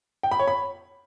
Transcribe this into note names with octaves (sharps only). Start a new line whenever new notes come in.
G5
B5
C#5
B5